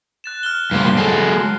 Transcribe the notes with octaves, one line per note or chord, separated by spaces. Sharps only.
F#6 A6 E7
F6 F#6 G7
G2 A#3 C5
F#3 G#3 A4 C7